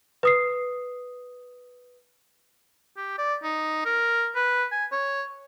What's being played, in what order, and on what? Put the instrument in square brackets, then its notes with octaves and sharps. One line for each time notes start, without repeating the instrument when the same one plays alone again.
[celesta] B4 D#6 C7
[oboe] G4
D5
D#4
A#4
B4
G#5
C#5